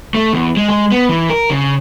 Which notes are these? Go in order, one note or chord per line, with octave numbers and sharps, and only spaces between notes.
A3
E2
G#3
G#3
B3
E3
A#4
C#3